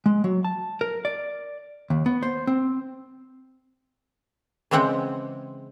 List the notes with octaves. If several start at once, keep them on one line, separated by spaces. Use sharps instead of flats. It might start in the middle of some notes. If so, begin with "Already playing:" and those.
G#3
F#3
A5
A#4
D5
D#2
B3
C5
C4
C#3 E3 G#3 C4 F#5 G5